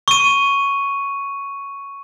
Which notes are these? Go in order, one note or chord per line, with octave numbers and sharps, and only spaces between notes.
C#6 D#7